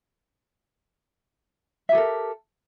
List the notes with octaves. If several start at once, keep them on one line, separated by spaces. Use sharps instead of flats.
G4 A4 A#4 E5